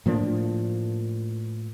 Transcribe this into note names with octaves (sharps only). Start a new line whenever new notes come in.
A2 F3 A#3 D4